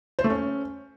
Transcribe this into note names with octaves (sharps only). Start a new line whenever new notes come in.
C5
A3
C#4